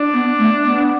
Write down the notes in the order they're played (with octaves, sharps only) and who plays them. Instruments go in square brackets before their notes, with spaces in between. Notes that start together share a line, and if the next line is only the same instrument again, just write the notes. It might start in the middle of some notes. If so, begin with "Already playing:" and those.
Already playing: [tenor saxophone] D4
[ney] B3
A3
B3